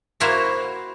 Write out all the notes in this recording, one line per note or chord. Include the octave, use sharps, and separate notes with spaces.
A#3 E4 F#4 C5 E5 A#5